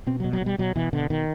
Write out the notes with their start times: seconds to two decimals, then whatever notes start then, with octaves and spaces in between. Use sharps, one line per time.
0.07 B2 C4
0.20 F#3
0.24 B2
0.33 F#3
0.41 B2 G3
0.58 B2 F#3
0.76 B2 E3
0.93 B2 D3
1.10 B2 D#3